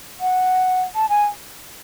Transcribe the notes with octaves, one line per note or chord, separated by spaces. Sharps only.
F#5
A5
G#5